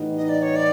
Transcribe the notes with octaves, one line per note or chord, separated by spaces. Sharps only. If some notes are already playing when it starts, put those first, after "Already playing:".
Already playing: A2 E3 G3 B3 D#4
D#5
D5
C#5
D5